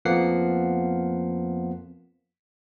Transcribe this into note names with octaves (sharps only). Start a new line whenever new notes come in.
F2 F3 A#3 B3 F#5 C7